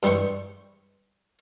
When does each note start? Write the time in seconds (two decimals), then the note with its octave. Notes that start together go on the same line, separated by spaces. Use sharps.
0.03 G2 G3 E4 C5 C#6